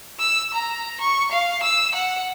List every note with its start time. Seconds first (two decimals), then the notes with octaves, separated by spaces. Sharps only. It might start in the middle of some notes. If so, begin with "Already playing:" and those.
0.20 E6
0.54 A#5
1.01 C#6
1.32 F5
1.63 E6
1.95 F#5